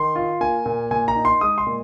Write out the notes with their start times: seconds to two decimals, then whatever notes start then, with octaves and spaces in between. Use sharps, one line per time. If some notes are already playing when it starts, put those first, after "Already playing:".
Already playing: D#3 C6
0.16 F4
0.41 A#3 G#5
0.66 A#2
0.91 A#2 G#5
1.08 A#5
1.16 D#4
1.25 C6
1.41 G#3 D#6
1.58 C6
1.67 A#2